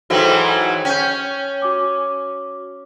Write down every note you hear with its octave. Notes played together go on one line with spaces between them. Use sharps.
G#2 E3 F#3 F#4 A4 G5
C#4 G5 G6
F#4 D6